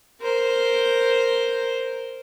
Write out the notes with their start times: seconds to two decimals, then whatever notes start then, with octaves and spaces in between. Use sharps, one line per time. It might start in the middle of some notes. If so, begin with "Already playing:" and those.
0.21 A#4 C5